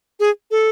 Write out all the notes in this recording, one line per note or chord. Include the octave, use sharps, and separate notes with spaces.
G#4
A4